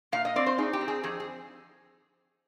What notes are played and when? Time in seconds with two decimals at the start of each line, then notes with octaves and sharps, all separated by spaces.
0.12 A#2 F5
0.25 D#5
0.36 C4 D5
0.46 C5
0.58 D#4 G#4
0.73 G4
0.81 C4
0.88 G#4
1.03 F2 G#4
1.20 G#4